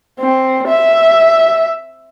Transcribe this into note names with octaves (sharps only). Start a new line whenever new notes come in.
C4
E5